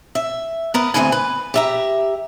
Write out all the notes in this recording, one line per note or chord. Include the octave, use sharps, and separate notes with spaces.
E5
B3 A#4 B4
D2 B2 E3 C4 B4 G#5
B4
G4 E5 A#5